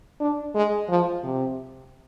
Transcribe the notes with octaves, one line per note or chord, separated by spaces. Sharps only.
D4
G#3
F3
C3